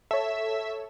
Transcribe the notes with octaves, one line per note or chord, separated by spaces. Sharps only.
A4 C#5 E5